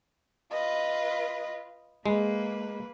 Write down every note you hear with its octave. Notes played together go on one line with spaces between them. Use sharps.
F4 B4 D#5
G#3 A#3 B4